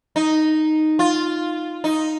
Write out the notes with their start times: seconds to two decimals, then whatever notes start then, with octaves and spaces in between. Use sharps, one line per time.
0.16 D#4
0.99 F4
1.84 D#4